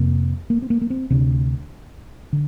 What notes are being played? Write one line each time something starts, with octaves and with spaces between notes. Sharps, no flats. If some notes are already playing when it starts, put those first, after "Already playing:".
Already playing: F2 C3 A#3
A#3
C4
A#3
A#3
C4
D2 C3 D4
D3